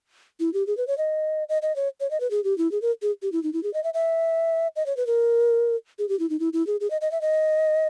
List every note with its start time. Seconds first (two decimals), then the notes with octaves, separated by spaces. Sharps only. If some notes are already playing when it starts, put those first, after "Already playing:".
0.40 E4
0.54 G4
0.67 G#4
0.77 B4
0.87 C#5
0.98 D#5
1.49 D#5
1.62 D#5
1.76 C#5
2.00 C#5
2.11 D#5
2.20 B4
2.31 G#4
2.44 G4
2.58 E4
2.72 G#4
2.82 A#4
3.02 G#4
3.22 G4
3.32 E4
3.43 D#4
3.53 E4
3.63 G#4
3.74 D#5
3.84 E5
3.94 E5
4.76 D#5
4.86 C#5
4.97 B4
5.07 A#4
5.99 G#4
6.09 G4
6.19 E4
6.30 D#4
6.40 E4
6.53 E4
6.67 G#4
6.81 G#4
6.91 D#5
7.01 D#5
7.12 E5
7.21 D#5